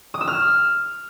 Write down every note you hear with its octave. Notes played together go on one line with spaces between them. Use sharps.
D#6
E6
F6